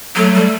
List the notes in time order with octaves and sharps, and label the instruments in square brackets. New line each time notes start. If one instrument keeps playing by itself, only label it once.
[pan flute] F#3 [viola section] A3
[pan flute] G3